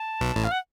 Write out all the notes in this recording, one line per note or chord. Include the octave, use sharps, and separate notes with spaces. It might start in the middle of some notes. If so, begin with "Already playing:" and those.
Already playing: A5
B1 B2
A1 A2
F5
F#5